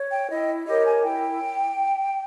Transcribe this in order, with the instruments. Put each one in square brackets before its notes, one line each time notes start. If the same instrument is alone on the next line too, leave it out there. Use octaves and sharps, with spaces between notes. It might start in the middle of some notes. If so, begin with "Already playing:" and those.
Already playing: [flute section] C#5
G5
E4 D#5
G4 A#4 C#5 D#5
G#5
E4 G5